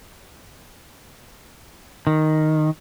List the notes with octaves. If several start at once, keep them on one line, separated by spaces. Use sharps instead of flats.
D#3